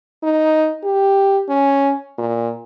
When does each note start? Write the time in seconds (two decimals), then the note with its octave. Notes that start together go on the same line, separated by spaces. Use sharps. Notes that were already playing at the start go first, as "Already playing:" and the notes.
0.23 D#4
0.84 G4
1.49 C#4
2.18 A#2